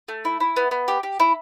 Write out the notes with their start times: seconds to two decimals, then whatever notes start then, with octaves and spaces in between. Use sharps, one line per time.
0.08 A3
0.25 E4
0.40 E4
0.56 B3
0.71 B3
0.88 G4
1.03 G4
1.20 E4